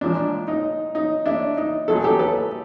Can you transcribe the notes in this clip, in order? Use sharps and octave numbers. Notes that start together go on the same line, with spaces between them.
A#2 F3 G#3 D4
D#4
D#4
D4 E4
D#4
A#2 F#3 A3 A4
G#4
G4 A4
A4 B4